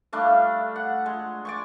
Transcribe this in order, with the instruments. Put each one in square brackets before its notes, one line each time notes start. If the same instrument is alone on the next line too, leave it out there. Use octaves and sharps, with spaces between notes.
[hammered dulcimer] G3 A3 D4 F5
F#5
G#3
D5 G#5 C#6